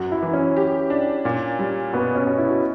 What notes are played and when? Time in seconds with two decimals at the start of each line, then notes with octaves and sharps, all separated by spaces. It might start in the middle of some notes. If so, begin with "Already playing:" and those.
Already playing: F#2 F#4
0.12 E4
0.23 E3
0.33 C#4
0.57 G4
0.90 D4
1.25 A#2
1.59 G3
1.93 B2 B3
2.15 C#4
2.27 B2
2.38 E4
2.50 F#4